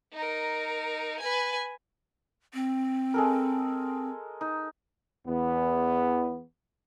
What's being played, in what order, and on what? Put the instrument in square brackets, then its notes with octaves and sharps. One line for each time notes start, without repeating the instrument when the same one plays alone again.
[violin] D#4 A#4
B4 G#5
[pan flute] C4
[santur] G#3 A4 A#4
D#4
[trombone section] E2 B3